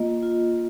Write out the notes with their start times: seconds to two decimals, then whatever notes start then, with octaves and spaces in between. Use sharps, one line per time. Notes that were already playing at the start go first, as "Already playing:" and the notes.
Already playing: A#3 F4 D#5
0.22 F4